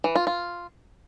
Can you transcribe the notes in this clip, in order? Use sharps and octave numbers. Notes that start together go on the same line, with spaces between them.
E3
F4
F4